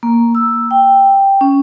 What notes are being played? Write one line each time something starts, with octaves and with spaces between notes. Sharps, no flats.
A#3
E6
G5
C#4